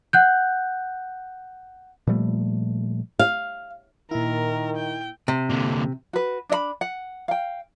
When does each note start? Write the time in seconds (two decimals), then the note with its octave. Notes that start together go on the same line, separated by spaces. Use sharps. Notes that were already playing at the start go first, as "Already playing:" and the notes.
0.13 F#5 F#6 G6
2.07 A#2 F3 G3 A3
3.19 F5
4.11 A#2 D#3 E4 A#4
4.76 G5
5.28 C3
5.49 A#2 D3
6.13 F#4 B4
6.49 D4 D#5 B5
6.81 F#5
7.28 F5 G5